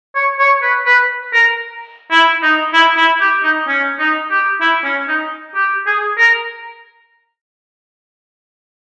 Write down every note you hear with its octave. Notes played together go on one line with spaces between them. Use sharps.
C#5
C#5
B4
B4
A#4
E4
D#4
E4
E4
G4
D#4
C#4
D#4
G4
E4
C#4
D#4
G4
G#4
A#4